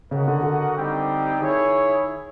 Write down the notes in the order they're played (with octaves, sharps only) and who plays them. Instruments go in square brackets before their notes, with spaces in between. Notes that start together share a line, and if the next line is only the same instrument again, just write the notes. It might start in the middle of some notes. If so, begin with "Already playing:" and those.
[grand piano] C#3 [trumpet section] F#4 A#4 D#5 F#5
[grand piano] D3
D3
[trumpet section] G3 C4 D#4 G4
[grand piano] D#3 [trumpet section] E4 G#4 C#5